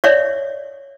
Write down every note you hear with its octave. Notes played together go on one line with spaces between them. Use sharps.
C#5 D5 E5